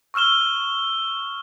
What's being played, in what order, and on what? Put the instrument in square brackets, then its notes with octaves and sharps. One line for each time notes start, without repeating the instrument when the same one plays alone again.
[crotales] C#6 E6 F6 E7 G7